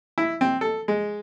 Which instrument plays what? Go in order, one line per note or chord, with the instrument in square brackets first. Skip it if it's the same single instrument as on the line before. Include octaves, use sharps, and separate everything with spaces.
[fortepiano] E4
C4
A4
G#3